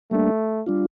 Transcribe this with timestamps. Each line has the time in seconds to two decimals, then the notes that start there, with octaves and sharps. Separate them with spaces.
0.11 G3 A3 A#3 D4
0.67 G3 D4 F4